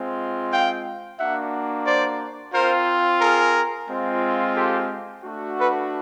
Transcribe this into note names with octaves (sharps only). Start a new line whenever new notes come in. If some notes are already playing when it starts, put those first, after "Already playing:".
Already playing: G#3 C4 F4
F5 G5
A#3 D4 F#4 E5 F#5
C5 D5
C4 F4 A#4 C5
G#4 A#4
G#3 C4 F4
G4 A4
A3 D4 F#4
A4 B4